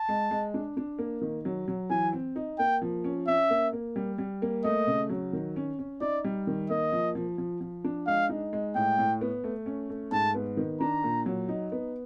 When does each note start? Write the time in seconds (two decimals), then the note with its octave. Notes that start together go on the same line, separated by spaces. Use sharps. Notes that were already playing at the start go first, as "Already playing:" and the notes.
Already playing: A5
0.09 G#3
0.31 G#3
0.54 D4
0.77 D4
0.99 A#3
1.21 D#3
1.45 F#3
1.68 F#3
1.90 E3 G#5
2.13 C4
2.36 D#4
2.59 A#3 G5
2.82 F3
3.04 C#4
3.28 C#4 E5
3.50 A#3
3.73 A#3
3.96 G3
4.18 G3
4.42 A#3
4.64 A3 D#5
4.87 C#3
5.09 F#3
5.33 D#3
5.56 C#4
5.79 C#4
6.01 D#4 D5
6.24 G3
6.47 D#3
6.70 A#3 D#5
6.92 F3
7.15 F3
7.38 F3
7.61 F3
7.84 D4
8.07 G#3 F5
8.29 D#4
8.53 G#3
8.75 A2 G5
8.98 A2
9.21 B3
9.44 A3
9.66 C#4
9.89 A3
10.12 G#2 A5
10.34 B3
10.57 D#3
10.81 D4 A#5
11.04 A#2
11.26 F#3
11.49 D#4
11.72 B3